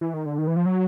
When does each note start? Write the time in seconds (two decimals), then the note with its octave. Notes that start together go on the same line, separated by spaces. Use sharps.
0.01 E3
0.14 D#3
0.26 D3
0.38 D#3
0.47 E3
0.56 F3
0.66 F#3